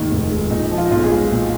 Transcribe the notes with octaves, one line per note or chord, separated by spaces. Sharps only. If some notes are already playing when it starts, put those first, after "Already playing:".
Already playing: F1 D#2 D#3 G#3
F1
G#3
A#2 D#4
F3
F4
D#4
B1 F4
G#4
G#3
A#2